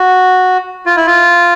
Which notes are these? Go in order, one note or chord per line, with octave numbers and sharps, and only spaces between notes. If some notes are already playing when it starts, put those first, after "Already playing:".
Already playing: F#4
F4
E4
F4